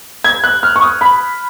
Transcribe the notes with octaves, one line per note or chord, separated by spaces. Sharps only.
G#6
F#6
F6
C#6
D#6
B5